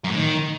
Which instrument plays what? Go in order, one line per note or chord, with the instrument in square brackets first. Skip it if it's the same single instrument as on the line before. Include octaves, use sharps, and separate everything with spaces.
[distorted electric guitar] F#2
A2
D#3